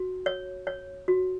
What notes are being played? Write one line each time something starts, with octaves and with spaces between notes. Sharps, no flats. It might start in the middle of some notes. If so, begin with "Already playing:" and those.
Already playing: F#4
C#5
C#5
F#4